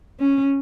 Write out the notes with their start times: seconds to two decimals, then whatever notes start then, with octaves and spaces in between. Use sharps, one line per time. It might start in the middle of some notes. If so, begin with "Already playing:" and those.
0.20 C#4